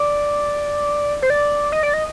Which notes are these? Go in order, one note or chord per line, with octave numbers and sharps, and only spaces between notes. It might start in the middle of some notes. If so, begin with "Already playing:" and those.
Already playing: D5
C5
D5
D#5
D5
D#5